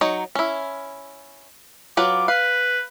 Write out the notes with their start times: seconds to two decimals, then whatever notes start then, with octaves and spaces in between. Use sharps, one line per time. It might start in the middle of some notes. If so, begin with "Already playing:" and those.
0.01 F#3 D#4 C#5
0.35 C#4 E4
1.97 F#3 F4 B4 D6
2.28 B4 F5